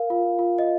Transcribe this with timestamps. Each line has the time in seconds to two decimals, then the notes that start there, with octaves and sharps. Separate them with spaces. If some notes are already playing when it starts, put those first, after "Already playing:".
Already playing: A#4 F5
0.10 F4
0.39 F4
0.58 D#5